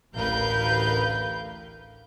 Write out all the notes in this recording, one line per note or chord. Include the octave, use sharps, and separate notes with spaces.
A1 D2 A#4 B4 F5 G6